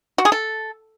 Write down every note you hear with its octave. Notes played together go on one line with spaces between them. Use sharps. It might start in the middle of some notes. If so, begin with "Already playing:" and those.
F#4
G#4
A4